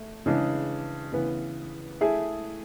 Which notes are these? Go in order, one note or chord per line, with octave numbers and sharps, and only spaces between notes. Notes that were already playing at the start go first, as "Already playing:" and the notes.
Already playing: A3
C#3 E3 G#3 D4
C#3 E3 B3
A3 E4 G#4